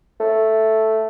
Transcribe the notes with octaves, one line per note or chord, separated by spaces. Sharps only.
A3